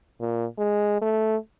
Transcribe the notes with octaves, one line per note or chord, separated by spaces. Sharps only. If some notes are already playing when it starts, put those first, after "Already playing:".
A#2
G#3
A3